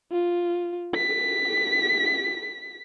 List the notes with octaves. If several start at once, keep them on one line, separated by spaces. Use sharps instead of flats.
F4
B6